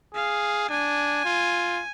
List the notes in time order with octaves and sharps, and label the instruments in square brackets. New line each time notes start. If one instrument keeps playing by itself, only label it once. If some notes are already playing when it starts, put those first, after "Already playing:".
[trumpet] G#4 [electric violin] F5
[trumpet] D4 [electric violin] G#5
[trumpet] F4